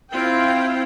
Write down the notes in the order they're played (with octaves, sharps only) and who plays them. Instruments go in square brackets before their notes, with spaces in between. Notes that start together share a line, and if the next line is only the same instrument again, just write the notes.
[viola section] C4 E4 F4 G5